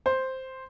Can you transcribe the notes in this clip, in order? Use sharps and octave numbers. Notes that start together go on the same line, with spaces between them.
C5